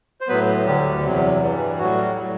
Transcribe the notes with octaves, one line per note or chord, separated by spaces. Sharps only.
C5
A2 F#3 B3 B4
D2 D3 F#3 G3 G4
E2 C3 F#3
G2 E3 G3
A2 F#3 G3 F#4
A2 F#3